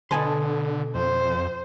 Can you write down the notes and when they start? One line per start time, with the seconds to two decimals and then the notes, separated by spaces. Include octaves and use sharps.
0.11 B2 D3 A4 B4 G#5 C6
0.95 F2 C5